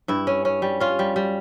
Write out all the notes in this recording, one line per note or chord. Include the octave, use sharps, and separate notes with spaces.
G2 E4
C#4
C#4
G3
C#4 F4
G3
G3